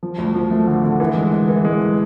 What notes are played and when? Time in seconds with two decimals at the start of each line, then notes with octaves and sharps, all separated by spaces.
0.03 F3
0.18 D2
0.34 F3
0.51 A3
0.67 D3
0.84 D3
1.00 E3
1.16 G#3
1.32 G#3
1.49 E3
1.65 G#3